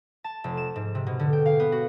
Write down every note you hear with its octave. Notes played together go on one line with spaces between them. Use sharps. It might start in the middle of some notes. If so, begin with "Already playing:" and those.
A5
F1
E7
G#2
C3
B2
D3
G5
F5
B3
F#4